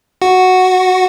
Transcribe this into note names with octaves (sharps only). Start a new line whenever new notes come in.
F#4